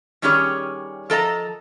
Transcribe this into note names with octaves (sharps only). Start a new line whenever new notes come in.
D#3 G3 C#4 G4 G#4 C#5
F3 A4 D#5 A#5